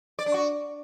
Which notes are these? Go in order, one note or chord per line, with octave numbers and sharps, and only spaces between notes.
D5
D4
F#4